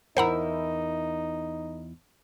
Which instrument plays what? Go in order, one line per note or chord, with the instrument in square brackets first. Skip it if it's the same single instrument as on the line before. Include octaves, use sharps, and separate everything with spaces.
[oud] E2 E4 [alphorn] D#4 [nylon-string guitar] A#4 [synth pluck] C5 F#5 A#5